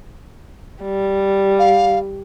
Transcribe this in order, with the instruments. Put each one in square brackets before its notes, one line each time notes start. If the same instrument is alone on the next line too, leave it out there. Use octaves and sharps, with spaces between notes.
[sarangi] G3
[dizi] F5